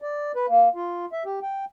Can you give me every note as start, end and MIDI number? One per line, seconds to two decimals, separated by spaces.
0.02 0.32 74
0.35 0.46 71
0.48 0.69 58
0.75 1.06 65
1.12 1.23 76
1.25 1.39 67
1.42 1.65 79